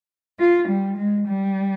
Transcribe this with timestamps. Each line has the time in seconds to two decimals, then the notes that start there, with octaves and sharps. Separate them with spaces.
0.38 F4
0.68 G3
0.96 G#3
1.27 G3